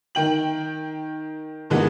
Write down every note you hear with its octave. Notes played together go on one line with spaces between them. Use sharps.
D#3 G5 F#7
G2 A#2 E3 G#3 B3